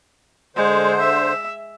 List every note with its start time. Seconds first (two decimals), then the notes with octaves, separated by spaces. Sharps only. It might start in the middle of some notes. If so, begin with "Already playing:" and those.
0.56 D3 G#3 C5
1.00 E5